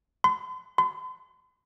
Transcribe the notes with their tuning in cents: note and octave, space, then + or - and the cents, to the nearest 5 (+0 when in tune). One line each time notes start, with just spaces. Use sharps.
C6 -45
C6 -45